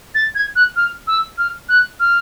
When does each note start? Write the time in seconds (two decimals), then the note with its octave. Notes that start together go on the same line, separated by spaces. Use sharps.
0.15 A6
0.35 G#6
0.56 F#6
0.76 F6
1.07 E6
1.38 F6
1.69 F#6
2.00 F6